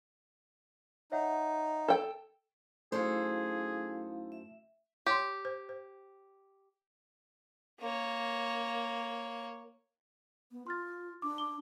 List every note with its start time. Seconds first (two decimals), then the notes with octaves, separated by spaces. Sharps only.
1.12 D#4 C#5 E5 F#5
1.88 A4 G5
2.92 F#2 A3 D#4 E4 G#4 A4 C5 F5
4.32 E5
5.06 G4 C#5 C6
5.45 C5
5.69 C5
7.80 A#3 C#5
10.51 B3
10.67 F4 C6 F6 A6
11.22 D4 D6
11.38 D6 G7